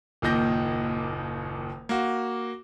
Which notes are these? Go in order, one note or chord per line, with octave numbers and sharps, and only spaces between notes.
F#1 D#2 A#2 D#3 G6 A#6
A#3 F#4